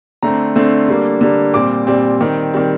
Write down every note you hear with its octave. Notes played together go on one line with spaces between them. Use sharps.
D3 A3 C4 A#5
D3 A3 C4
D3 G3 A#3
D3 G3 A#3
A#2 G3 C4 D6
A#2 G3 C4
D#3 G3 C4
D#3 G3 C4